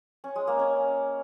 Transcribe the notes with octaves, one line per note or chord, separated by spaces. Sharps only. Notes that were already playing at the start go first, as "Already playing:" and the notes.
C#4
G#3
A#3
C#4